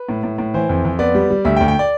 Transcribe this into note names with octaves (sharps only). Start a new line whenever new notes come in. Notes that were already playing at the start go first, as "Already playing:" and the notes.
Already playing: B4
A2
A2
A2
E3 C5
F2
F2
B3 D5
G3
G3
D2 E5
G5
D2
G5
D5